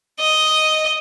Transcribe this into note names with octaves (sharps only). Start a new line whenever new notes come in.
D#5